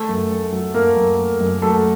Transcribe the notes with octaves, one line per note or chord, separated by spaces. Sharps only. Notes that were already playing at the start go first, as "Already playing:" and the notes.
Already playing: A3 A4
F#2
A3
F#3
F#2 A#3 A#4
F#2
A3
F#2
F#3 A3 A4